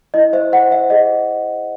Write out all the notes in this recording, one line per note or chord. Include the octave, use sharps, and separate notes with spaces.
E4 D#5
C5 E5
C5 F#5
C5 E5
G#4 D#5